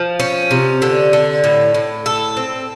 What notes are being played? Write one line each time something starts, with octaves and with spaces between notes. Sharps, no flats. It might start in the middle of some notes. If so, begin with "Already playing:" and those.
Already playing: F3
C#4
C3
D3
D3
A2
A2
A4
C4